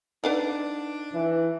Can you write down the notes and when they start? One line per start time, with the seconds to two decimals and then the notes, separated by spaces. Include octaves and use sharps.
0.24 D4 D#4 B4 D5 F5 F#5
1.15 E3